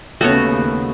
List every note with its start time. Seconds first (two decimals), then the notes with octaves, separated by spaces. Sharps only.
0.21 D#2 C#3 A3 B3 F#4 C#5